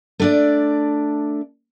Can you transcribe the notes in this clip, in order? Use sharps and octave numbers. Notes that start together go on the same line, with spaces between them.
A3 D4 D5